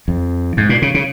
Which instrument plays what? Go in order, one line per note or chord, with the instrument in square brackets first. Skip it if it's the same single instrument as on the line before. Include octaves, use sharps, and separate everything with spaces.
[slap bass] F2
G#2
A#2
C#3
C#3